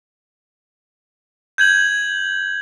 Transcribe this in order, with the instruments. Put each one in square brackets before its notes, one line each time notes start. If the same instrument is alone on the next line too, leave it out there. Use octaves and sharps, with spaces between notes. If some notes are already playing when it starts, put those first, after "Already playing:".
[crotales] G6 G#6 F#7